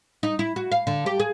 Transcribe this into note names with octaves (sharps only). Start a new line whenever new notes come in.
D#4
E4
F#4
F5
D3
G4
G#4